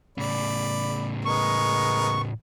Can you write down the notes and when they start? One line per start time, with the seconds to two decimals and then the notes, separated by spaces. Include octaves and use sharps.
0.18 A2 C#3 D5 B5
1.25 G#3 B3 A#4 C#6